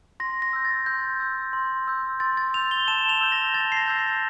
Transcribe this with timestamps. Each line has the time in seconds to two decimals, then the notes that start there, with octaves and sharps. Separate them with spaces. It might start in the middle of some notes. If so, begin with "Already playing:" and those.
0.20 C6 A#6
0.42 A#6
0.53 E6 G6
0.65 A6
0.86 C6 G6
1.20 E6 G6
1.53 C6
1.88 E6 G6
2.20 C6 A6
2.37 A6
2.54 E6 F7
2.57 G6
2.71 G7
2.88 A5 E7
3.09 F7
3.21 E6 G6
3.32 A#6
3.54 A5 A6
3.72 C7
3.77 A#6
3.88 E6 G6
3.99 C7